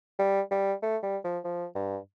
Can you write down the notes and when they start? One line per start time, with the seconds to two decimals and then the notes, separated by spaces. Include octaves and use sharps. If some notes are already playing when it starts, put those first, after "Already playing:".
0.19 G3
0.51 G3
0.82 A3
1.03 G3
1.24 F3
1.44 F3
1.75 G2